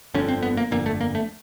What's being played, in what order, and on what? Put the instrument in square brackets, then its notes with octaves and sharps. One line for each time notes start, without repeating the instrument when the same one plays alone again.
[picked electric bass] G1 F2 D3 C#4
C4
B3
A#3
G1 F2 D3 A#3
A3
A#3
A3